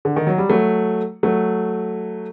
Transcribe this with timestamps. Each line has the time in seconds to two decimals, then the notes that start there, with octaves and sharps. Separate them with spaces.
0.05 D3
0.16 D#3
0.27 F#3
0.38 G3
0.50 F#3 A3
1.23 F#3 A3